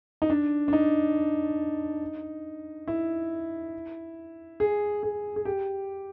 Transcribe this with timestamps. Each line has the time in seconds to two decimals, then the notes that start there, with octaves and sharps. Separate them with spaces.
0.22 D#4
0.30 D4
0.68 D4
0.73 D#4
2.88 E4
4.60 G#4
5.03 G#4
5.36 G#4
5.45 G4